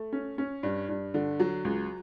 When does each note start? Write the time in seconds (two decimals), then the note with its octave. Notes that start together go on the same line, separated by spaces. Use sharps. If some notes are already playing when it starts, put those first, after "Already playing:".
Already playing: A3
0.13 C#4
0.38 C#4
0.63 G2
0.89 G2
1.14 D3
1.40 F#3
1.65 C#2